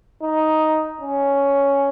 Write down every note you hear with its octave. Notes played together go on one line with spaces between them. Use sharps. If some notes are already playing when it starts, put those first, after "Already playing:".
D#4
C#4